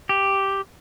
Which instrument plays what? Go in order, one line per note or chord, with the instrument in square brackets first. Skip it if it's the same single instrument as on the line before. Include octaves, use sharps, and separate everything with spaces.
[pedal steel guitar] G4